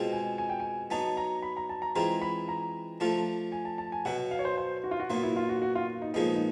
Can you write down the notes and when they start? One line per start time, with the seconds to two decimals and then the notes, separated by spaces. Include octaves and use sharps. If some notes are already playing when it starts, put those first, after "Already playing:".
Already playing: B2 G#3 C4 F4
0.12 G#5
0.38 G#5
0.49 G5
0.60 G#5
0.90 F#3 B3 D#4 A5
1.17 A#5
1.42 B5
1.57 A#5
1.69 A5
1.82 A#5
1.96 E3 G#3 C4 F4 A#5
2.22 B5
2.48 A#5
3.00 F3 A3 D4 F4
3.52 G#5
3.65 A5
3.78 A5
3.92 G#5
4.05 B2 F#3 B3 F#5
4.31 F5
4.39 C#5
4.45 C5
4.58 C5
4.84 F#4
4.91 F4
5.00 F#4
5.10 A#2 F#3 B3 F4
5.23 E4
5.36 F4
5.49 F#4
5.62 F#4
5.75 F4
6.02 D#4
6.14 A#2 F3 G#3 B3 D#4
6.35 D#4